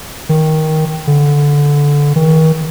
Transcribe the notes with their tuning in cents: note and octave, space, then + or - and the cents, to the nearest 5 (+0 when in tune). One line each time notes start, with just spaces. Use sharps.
D#3 +10
D3 -15
D#3 +40